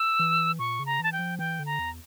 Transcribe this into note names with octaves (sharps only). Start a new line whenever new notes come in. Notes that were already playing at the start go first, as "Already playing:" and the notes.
Already playing: E6
E3
A#2 C#6
C#3
A#5
E3 A5
G5
F3
E3 G5
D3
A#5
E2